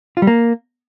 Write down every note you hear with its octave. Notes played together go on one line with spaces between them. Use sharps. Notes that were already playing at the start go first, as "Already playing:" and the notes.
F4
G3
A#3